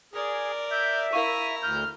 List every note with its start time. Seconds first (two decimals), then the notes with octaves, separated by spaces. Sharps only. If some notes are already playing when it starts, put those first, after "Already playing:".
0.14 G#4 A#4 D5
0.71 E5 G6
1.13 E4 A#4 F5 A#5 C#6 D#7
1.63 D2 F6 G6